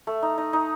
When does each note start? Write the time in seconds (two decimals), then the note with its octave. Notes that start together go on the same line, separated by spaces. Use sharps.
0.07 A3
0.22 D#4
0.38 D#4
0.53 D#4